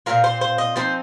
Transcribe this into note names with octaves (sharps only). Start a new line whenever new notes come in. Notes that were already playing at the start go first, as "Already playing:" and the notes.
A#2 G#3 C4 F4 A#4
C5
C5
D#5
F3 C4 D#4 C5